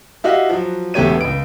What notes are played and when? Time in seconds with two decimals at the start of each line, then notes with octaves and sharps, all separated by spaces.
0.24 E4 F#4 G4 D#5 F5
0.50 F3 F#3
0.94 E1 A3 B3 G4 C#5 D#7
1.21 C#2 D7